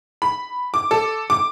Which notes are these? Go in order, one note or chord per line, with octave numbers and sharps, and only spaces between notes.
B5
D6
A4
D6